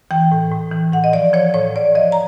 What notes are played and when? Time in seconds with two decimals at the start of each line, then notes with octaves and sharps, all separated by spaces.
0.11 E3 G5
0.31 A2
0.51 A2
0.72 E3
0.93 A2 F#5
1.04 D#5
1.13 F3 D5
1.33 F3 C#5
1.54 A2 C#5
1.75 A2 D5
1.95 F3 D#5
2.12 A#5